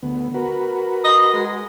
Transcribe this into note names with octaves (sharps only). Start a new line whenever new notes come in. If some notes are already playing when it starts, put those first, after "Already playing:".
D2 B3
F#4 A#4 B4
D#5
G#3